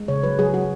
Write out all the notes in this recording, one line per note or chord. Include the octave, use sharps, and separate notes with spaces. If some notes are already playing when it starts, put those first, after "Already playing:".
Already playing: G#3
C#3 C#5
F#3 B4
F#3 G#4
F#3 F#4